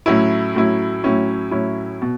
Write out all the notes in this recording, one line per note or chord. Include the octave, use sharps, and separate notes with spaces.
A2 F#3 C#4 E4
A2 F#3 C#4 E4
A2 F#3 C#4 E4
A2 F#3 C#4 E4
B2